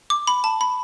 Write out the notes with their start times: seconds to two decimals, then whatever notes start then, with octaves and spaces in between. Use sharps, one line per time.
0.10 D6
0.27 B5
0.44 A5
0.61 B5